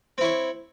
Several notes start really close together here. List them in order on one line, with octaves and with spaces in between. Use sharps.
C4 E4 C#5